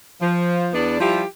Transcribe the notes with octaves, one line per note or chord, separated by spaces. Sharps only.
F3
E2 B3 D4 D5
F3 G3 E4 F4 G4